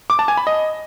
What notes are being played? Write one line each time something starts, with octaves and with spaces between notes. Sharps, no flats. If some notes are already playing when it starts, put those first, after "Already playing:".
D6
A5
G#5
B5
D#5